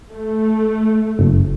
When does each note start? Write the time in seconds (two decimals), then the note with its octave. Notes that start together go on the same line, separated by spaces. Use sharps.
0.11 A3
1.19 F#1